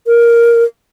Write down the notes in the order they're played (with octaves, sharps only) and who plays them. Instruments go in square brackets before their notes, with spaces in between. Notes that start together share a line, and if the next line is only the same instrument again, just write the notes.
[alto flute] A#4